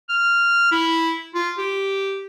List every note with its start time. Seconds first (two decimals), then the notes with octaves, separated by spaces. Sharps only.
0.09 F6
0.72 E4
1.35 F4
1.58 G4